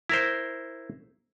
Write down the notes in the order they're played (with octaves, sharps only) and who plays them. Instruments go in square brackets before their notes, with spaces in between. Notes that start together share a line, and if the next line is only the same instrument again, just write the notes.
[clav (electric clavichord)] E4 A#4 C5